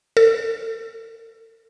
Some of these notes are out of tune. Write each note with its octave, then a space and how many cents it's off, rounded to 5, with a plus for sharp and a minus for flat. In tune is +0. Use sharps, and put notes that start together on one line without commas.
A4 +45